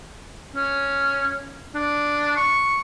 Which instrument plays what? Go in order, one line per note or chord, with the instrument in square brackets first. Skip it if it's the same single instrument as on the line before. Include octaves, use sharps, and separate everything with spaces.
[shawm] C#4
D4
C#6